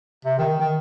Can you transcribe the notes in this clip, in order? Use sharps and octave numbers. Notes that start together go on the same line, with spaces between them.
C3
D#3
D#3